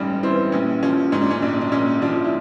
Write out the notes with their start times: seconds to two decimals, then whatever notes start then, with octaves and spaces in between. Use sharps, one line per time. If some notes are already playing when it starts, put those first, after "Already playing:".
Already playing: A1 G2 G3 C#4 D#4
0.23 E3 C4
0.52 A#1 C#4
0.83 F3 C#4
1.12 G#2 C#4
1.22 D4
1.31 C#4
1.42 A#1 D4
1.61 D4
1.72 A#1 C#4
2.02 F3 D4
2.25 E4